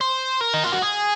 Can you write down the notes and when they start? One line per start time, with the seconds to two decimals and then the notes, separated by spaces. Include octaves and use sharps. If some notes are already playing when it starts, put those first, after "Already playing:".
0.01 C5
0.41 A#4
0.54 D#4
0.64 F4
0.72 F#4
0.82 G#4